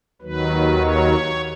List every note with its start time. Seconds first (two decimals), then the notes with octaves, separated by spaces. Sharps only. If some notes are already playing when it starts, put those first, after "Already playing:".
0.21 D#2 D#3 F#3 B4
0.80 C#5